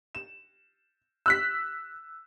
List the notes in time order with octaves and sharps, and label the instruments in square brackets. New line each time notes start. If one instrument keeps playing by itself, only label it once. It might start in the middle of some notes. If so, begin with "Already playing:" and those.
[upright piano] E7
E6 F#6 B6